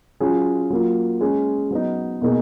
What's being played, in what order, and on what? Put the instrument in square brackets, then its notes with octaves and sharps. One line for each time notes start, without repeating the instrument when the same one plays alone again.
[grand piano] F#3 C#4 F4 G#4
F#3 A#3 F4
G#3 C#4 G#4
F#3 B3 D#4
B2 A#3 D#4 G#4